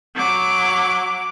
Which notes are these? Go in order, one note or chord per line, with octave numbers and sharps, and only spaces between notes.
F#3 D6